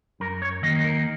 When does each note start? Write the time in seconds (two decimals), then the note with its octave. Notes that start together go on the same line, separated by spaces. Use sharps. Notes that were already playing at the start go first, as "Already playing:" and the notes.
0.20 F#2 A#4
0.42 C#5
0.63 D#3 A#3 D#4 D#5
0.85 A#4